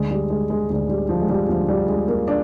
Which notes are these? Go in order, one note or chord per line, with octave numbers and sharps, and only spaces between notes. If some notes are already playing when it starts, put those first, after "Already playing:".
Already playing: D2 D3 G#3
G3
G#3
G#3
D2 D3 G#3
G3
F3
G#3
G3
D2 D3 F3
G3
G#3
A#3
D4